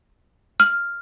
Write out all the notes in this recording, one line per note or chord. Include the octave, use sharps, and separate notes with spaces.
F6